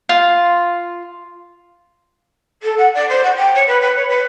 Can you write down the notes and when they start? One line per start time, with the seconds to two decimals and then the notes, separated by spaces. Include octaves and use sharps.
0.09 F4
2.62 A4
2.77 F#5
2.94 D5
3.08 C5
3.23 F#4
3.36 G5
3.54 C#5
3.67 B4
3.81 B4
3.95 C#5
4.08 B4